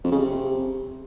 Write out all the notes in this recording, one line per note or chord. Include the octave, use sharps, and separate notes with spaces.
F2
C#3
C3